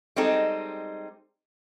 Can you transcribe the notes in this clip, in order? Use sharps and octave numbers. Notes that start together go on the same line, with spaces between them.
G3 G#3 C4 D#4 A4